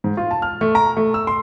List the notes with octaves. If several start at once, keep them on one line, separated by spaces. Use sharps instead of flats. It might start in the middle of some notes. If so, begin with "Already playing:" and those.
G#2
F4
A5
F6
A3
A#5
A3
E6
C6